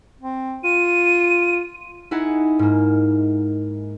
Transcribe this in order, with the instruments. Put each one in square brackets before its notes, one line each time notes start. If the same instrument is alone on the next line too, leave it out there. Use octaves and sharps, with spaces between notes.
[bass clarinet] C4
[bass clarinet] F4 [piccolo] D#7
[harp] D#4 E4 G#4 F#5
G#2 A#3